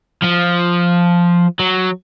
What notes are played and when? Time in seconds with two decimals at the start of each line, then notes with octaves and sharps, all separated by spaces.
0.22 F3
1.59 F#3